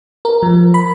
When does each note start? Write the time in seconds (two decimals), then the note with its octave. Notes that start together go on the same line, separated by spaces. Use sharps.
0.25 A#4
0.43 F3
0.74 B5